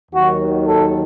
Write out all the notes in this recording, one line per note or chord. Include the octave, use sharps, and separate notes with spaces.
D#2 D#3 F#3 F#4
A4